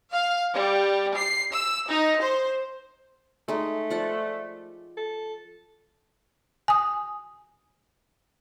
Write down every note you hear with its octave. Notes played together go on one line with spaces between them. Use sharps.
F5
G3
C7
E6
D#4
C5
G#3 A3 D#4
F3 D5 F#5
A4
G#5 D#6